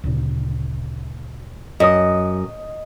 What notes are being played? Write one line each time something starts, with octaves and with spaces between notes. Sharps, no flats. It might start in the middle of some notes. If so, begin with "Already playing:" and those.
D2 A#2 C#3
F#2 D#5 D#6